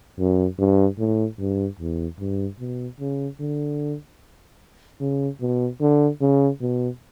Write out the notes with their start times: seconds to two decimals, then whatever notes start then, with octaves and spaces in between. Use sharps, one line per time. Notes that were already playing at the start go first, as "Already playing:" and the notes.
0.18 F#2
0.59 G2
0.99 A2
1.39 G2
1.79 E2
2.20 G2
2.60 B2
3.00 C#3
3.40 D3
5.00 C#3
5.41 B2
5.81 D3
6.21 C#3
6.61 B2